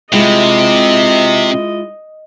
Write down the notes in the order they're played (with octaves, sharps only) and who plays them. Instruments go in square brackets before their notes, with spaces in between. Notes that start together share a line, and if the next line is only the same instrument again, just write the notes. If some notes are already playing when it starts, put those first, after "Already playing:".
[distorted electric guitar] C3 [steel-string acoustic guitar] G#3 E4 F4 [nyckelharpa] D#5